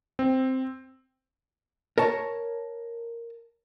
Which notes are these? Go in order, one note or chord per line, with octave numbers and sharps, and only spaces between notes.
C4
A#4 C#5 A5